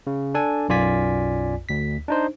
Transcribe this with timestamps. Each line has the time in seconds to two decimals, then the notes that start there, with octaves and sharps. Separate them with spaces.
0.07 C#3
0.34 D4 A4 G#5
0.69 B1 F#2 F4 D5 G#5 B6
1.69 D2 B6
2.08 D4 D#4 C5